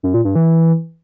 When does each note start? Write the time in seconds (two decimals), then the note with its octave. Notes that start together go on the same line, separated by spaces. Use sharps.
0.03 F#2
0.14 A#2
0.25 G2
0.35 E3